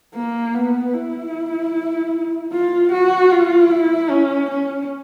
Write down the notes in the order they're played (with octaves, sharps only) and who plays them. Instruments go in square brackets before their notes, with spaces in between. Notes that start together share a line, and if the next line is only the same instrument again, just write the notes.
[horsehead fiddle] A#3
B3
E4
F4
F#4
F4
E4
C#4
C#4